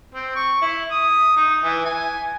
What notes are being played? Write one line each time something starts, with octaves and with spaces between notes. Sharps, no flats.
C4
C#6
E4
D#6
D#4
E3
G#5